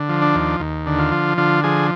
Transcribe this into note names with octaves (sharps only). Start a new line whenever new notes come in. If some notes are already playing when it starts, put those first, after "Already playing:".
Already playing: D3
F3
D4
D#2
D#2
D3
F4
F3
D3 F4
F3 G#4